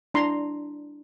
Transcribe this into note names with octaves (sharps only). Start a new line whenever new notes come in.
D4 E4 A#5 C6